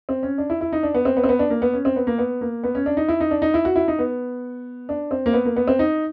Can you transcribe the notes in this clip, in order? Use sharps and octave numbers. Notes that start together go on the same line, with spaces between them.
C4
C#4
D4
E4
E4
D#4
D4
B3
C4
B3
C4
B3
D4
A#3
B3
C#4
C4
B3
A#3
B3
A#3
B3
C#4
D4
D#4
E4
D#4
D4
D#4
E4
F#4
E4
D#4
B3
D4
C4
A#3
B3
A#3
B3
C4
D#4